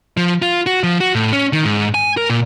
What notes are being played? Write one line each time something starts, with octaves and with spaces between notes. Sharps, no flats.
F3
F4
F#4
F3
F#4
A2
C#4
D#3
G#2
G#5
A#4
A#2